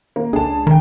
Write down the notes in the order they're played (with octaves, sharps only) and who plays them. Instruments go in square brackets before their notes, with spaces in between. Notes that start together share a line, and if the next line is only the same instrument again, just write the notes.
[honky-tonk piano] A#3
[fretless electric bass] C#2 D4 [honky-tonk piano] G#4 A5
[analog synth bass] D#3 [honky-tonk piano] G5 A#5